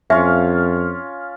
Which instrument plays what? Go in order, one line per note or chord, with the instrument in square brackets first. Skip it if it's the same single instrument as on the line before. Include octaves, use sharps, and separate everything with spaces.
[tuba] F2 [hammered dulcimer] C#4 F4 F5 [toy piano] E5